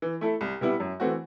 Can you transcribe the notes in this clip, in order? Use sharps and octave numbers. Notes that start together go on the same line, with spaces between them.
E3
A3 E4 A4
C2
C3 G3 B3 E4
F#2
E3 A3 C4 F#4